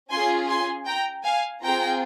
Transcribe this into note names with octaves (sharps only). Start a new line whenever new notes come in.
C#4 F4 G#4 G#5 C6
G#5 C6
G5 A#5
F5 G#5
C4 F4 G#4 G5 A#5